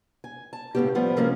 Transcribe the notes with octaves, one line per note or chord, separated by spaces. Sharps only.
G#5
A5
A2 C#3 A#3 B3 C#4 G4
F3 G3 B3
C3 F3 G#3 A#3 C#4 A#4